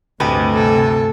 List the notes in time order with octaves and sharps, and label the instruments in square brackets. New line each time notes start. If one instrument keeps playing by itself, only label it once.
[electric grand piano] D2 [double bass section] G2 C3 A3 [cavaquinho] G4 B4 D#5
[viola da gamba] A4